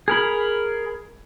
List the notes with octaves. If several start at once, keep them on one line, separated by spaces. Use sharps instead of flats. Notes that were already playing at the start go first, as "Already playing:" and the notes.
G#4 A#4 B5